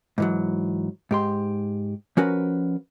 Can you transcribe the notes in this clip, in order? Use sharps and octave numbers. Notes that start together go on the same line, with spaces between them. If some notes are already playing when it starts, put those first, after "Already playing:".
G#2 E3 F#3
G#2 G4 C6
F3 C#4 F#4 A#4 B4